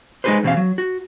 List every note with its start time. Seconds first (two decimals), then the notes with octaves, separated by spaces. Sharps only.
0.24 G#3 D#4 F#4 G#4 B4 C5
0.43 E2 B2 C4 C#4 F5
0.57 F#3
0.78 F#4